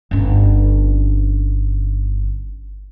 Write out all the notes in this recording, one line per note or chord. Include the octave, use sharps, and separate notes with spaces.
G1 C#4